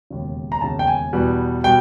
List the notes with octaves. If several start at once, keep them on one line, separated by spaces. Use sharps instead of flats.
E1 D#2 C#3
A#5
E1 D#2 C#3 A5
G5
G#5
E2 B2 G3 B3
B2 G3 B3 G5